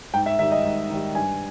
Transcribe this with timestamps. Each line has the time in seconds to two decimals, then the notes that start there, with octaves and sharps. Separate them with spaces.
0.13 G#2 G5
0.26 E5
0.39 D#3 G3 E5
0.52 D#5
0.64 G#2
0.90 D#3 G3
1.15 G2 G#5